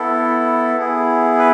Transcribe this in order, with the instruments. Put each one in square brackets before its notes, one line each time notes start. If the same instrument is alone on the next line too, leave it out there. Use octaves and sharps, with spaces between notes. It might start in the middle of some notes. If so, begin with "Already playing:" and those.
Already playing: [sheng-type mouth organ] B3 E4 A4
B3 E4 G#4
B4